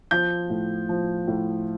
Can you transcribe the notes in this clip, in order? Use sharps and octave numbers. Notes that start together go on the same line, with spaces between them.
F3 G6
A2
F3
A2